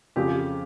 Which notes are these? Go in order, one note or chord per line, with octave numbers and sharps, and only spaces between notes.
F2 C#3 F3 G#3 G4